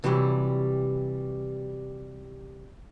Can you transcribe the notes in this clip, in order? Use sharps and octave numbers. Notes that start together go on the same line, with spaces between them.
C3 E3 F#3 G3